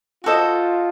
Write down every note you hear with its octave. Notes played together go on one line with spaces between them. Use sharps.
F4 F#4 A4 C5 D#5